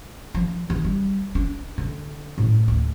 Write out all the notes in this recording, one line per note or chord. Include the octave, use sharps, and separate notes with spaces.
F3
E2
G3
D4
D3
A2
D2